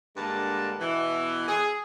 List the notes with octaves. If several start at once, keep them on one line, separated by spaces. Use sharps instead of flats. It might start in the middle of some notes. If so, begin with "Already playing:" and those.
G2 D3 G#3 A#3 B4 A5
B2 E3
G#4